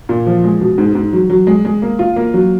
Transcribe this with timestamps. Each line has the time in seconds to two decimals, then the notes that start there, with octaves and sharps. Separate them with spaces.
0.09 A#2
0.27 F3
0.44 G#3
0.61 B2
0.78 G#2
0.95 G#2
1.13 F#3
1.30 F#3
1.47 G#3
1.65 G#3
1.82 A#3
1.99 F4
2.16 A#3
2.34 F#3